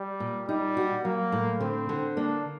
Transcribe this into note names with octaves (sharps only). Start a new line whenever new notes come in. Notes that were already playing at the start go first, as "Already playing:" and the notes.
Already playing: G3
A#2
G3 D#4
F#4
F#3 A#3
A2
D3 C4
D3
A#3 D4